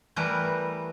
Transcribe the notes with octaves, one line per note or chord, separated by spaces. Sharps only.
E3 G3 A3 A#4 B4